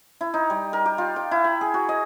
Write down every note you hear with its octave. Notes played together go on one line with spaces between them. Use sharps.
E4
D#4
G3
A#4
G4
F4
G5
E4
B5
G#4
F#4
D#5